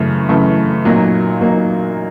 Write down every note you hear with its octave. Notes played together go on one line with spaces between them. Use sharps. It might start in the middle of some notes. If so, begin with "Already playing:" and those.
Already playing: F#2 C#3 E3 A3
F#2 C#3 E3 A3
A#2 F#3 A#3 D#4
A#2 F#3 A#3 D#4